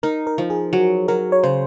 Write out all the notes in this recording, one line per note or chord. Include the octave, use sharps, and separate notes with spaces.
D#4 A#4
A#4
F3
G#4
F#3 F#4
F#3 A#4
C#5
C#3 C5